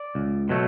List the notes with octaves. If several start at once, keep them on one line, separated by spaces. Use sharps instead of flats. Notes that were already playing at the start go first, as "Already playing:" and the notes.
Already playing: D5
C#2
B2 F#3 A3